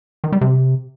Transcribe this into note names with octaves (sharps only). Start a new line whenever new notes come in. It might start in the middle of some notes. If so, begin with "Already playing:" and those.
D#3
G3
C3